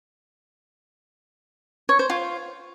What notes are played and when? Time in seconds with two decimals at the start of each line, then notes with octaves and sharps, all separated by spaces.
1.89 C#5
1.99 C5
2.10 F4